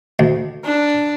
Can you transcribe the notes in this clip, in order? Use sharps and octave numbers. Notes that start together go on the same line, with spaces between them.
D2
D4